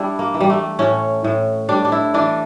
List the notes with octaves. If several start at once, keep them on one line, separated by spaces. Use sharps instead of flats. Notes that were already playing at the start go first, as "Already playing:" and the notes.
Already playing: G3 D4 E4
A#3
E3
G3
A3
A2 C#4
A2
G3 D4
D4
E4
E3 D4